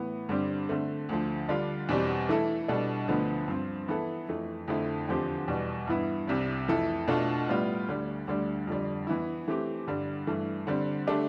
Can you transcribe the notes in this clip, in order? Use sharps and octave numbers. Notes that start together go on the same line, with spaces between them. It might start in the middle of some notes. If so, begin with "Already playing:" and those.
Already playing: A2 E3 B3
G2 D3 G3 C4 G4
D3 A3 C4
D2 D3 F3
D3 G3 D4 F4
E2 B2 G3 C4 G4
E3 A3 E4 A4
B2 G3 D4 A4
D2 D3 F3 B3
G2 F3 C4
E3 B3 E4 A4
F2 E3 A3
F2 D3 F3 A3 E4
E2 D3 F3 C4 G4
E2 B2 G3
G2 E3 B3 E4
C2 C3 G3
F2 E3 A3 E4 A4
B2 A3 D4 F4 A4
A2 G3 B3 F4
D2 D3 G3
D2 D3 G3
F2 D3 G3
E3 B3 E4
E3 A3 C4 G4
G2 D3 G3
G2 E3 A3
D3 G3 C4
D3 A3 D4 G4